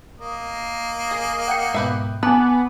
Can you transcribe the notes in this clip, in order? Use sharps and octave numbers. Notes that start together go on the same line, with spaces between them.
A#3 D#5
G#4
F#5 G5 C#7
G#2 B2 G4 B4 E5
B3 G#5 A5 D6 F#6